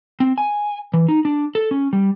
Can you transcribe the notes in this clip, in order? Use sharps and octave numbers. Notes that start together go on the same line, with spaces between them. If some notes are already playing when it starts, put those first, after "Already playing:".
C4
G#5
E3
D#4
D4
A4
C#4
G3